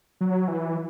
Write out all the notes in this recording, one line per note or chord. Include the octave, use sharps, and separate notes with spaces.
F#3
E3